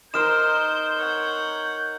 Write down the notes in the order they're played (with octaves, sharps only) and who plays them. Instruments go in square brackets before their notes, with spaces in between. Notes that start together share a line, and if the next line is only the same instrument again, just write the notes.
[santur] D#4 A#4 [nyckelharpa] C5 [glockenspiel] F6 E7 [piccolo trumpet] G6
[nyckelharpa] C#5 F#5